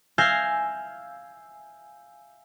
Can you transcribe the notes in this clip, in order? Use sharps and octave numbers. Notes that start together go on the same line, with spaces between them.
E5 F5 G#5 G6 A#6 C7